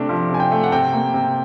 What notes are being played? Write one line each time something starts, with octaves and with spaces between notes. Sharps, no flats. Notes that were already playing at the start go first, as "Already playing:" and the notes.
Already playing: C3 A3 D4 D6
F3
C3
G#5
G5
A3
F#5
C3 G5
A#3
C3